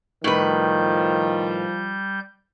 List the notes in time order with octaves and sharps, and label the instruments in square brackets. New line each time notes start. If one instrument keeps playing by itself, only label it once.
[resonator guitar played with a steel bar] A2 B4 [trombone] D#3 [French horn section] F3 [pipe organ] G3 G6